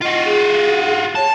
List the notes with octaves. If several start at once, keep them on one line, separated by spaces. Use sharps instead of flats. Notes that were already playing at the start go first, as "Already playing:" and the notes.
F4 F#4 D#5
G#4
C#5 A5